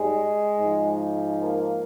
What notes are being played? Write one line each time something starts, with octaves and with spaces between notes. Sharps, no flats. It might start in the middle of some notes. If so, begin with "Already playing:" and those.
Already playing: G#2 G3 G#3
G#2 F3
A#3